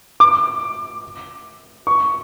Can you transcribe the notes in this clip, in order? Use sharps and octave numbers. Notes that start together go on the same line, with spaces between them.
D6
C#6